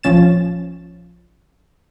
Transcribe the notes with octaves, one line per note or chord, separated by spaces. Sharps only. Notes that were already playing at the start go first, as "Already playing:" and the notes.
A#1 F3 C#4 A6 E7